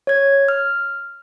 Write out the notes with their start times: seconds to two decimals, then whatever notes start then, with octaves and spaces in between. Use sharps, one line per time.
0.07 C#5 G#6
0.48 F6